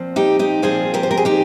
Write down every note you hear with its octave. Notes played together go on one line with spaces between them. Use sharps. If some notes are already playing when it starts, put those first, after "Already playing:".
Already playing: A#2 F3 C4
D#4 G4
D#4 G4
A#2 F3 C4 F4 G#4
G4 A#4
C5
A#4
G#4
D#4 G4